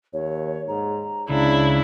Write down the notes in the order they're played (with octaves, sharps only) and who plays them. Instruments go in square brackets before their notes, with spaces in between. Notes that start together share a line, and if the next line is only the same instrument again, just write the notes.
[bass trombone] D#2 [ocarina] C#5
[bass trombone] G#2 [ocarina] A#5
[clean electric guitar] C#2 [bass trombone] C#3 [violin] D4 E4